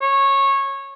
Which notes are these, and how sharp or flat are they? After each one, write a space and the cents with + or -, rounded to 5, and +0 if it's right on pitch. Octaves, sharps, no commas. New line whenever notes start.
C#5 -15